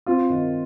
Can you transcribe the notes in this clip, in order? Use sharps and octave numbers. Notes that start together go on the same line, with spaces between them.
C4 F4
D#3